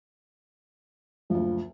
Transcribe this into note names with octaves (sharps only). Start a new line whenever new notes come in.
F#1 D2 F3